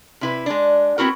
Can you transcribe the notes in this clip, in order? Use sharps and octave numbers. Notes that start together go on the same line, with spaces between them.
C3 E4 B4
G#3 D4
B3 C4 E4 F#4 A#4